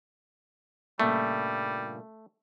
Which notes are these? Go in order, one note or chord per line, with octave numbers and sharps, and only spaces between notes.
G2 A#2 C#3 G3 A3